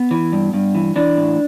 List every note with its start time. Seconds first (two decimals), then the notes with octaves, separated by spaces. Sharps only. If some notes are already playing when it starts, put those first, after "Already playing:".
Already playing: B3
0.11 E3
0.32 G2
0.54 G2
0.75 E3
0.96 E3 D4
1.17 A2